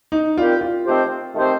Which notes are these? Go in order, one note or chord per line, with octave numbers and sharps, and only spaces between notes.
D#4
G3 C4 F4 G4 A#4
F4
D#3 A3 C4 G4 C5
D#3 A3 C4 G4 C5